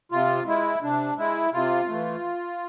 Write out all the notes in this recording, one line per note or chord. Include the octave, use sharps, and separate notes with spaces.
C3 F4
G#3 E4
C3 D4
G#3 E4
C3 F4
E3 A3